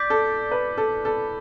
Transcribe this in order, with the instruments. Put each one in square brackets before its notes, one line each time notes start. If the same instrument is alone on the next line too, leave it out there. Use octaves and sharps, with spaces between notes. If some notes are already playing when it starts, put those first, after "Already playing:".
Already playing: [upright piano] D5 [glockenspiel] D6 G6 B6
[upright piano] A4
B4
A4
A4